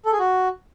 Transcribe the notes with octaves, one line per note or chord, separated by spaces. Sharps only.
A4
G#4
F#4